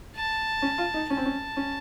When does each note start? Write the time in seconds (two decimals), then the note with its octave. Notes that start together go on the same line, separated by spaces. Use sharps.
0.16 A5
0.62 C#4
0.78 F4
0.94 D#4
1.10 C#4 A5
1.17 C4
1.25 C#4
1.57 C#4